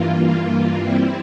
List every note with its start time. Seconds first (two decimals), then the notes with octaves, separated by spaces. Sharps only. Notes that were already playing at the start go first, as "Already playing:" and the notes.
Already playing: G2 E3 A#3 F4
0.83 G3 C4 E4